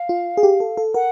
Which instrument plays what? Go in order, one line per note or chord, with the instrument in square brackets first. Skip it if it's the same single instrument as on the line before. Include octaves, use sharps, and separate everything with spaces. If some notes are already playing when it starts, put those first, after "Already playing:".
Already playing: [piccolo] F5
[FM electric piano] F4
G#4
G4
A4
A4
[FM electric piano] A#4 [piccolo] F#5